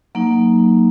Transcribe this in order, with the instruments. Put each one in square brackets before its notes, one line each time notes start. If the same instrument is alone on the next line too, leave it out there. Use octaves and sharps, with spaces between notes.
[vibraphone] F#3 A#3 D#4